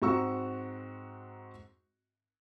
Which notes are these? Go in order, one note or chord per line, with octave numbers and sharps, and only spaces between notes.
G#2 C4 F#4 A#5 C#6 E6